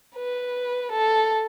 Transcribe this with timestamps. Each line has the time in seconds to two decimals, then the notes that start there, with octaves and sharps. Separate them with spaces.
0.17 B4
0.92 A4